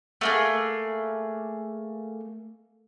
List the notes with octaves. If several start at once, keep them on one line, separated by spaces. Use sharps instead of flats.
A3 A#3 G#4